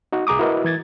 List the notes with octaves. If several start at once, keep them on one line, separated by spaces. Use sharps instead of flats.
D#4 F#4
C2 G#4 A#5 D6 D#6
E4 F#4 A#4 B4 D#5
E3 G#6 A6